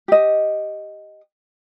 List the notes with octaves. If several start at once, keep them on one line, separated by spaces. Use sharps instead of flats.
G4 D#5